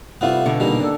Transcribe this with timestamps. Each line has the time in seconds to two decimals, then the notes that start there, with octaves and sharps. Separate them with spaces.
0.21 C3 G3 A3 B3 F4
0.46 B2 D3
0.60 A#2 D#3 G3 A#3 D#4
0.80 D4 A4